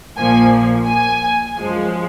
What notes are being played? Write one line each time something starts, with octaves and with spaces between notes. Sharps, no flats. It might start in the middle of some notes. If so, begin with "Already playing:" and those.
A#1 A#2 F3 A#3 G#5
G#5
F#2 F3 G#3